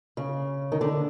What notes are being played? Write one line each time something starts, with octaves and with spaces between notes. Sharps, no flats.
C#3
D#3
D3